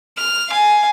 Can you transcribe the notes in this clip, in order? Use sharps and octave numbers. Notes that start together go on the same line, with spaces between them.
F6
F5 G#5